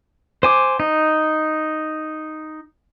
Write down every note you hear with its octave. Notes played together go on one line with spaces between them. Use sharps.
C5 G#5 D6
D#4